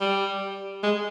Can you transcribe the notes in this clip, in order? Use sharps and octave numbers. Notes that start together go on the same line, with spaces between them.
G3
G#3